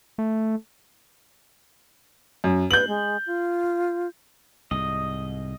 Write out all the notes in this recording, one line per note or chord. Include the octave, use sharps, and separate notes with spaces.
A3
F#2
B4 G6 F#7
G#3
F4
C2 G#2 D#5